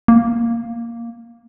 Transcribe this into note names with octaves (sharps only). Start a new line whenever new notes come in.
A#3